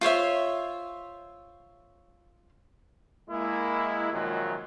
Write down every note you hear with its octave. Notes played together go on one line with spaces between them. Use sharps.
F4 C5 C#5 E5
G#3 A#3 E4
F#2 A#2 D#3 F3 F#3 G#3